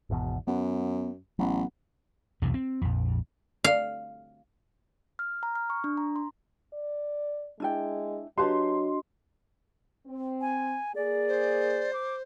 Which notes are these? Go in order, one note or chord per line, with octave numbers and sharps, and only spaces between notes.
G#1 E2 B2
F#2 B3
A1 F#3 B3
B1 E2 G2 C3
C4
A#1 F2
F5
F6
A#5
F6
C#6
D4
A#5
C6
D5
G#3 D4 E4 G5
F#3 D4 F#4 G4 B4 D#5 A5 C6
C4
G#5
A#3 G#4 D5
C5
D6